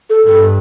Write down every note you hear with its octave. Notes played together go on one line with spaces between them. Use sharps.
A4
G2 A4